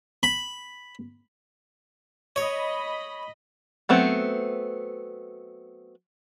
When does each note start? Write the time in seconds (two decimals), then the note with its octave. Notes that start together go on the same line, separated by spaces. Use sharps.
0.23 B5
2.36 C#5 D#5 B5
3.89 F#3 A3 B3 C4